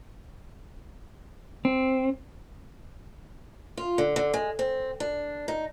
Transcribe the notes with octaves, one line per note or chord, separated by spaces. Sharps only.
C4
F4
D3
D3
G#3
C4
D4
D#4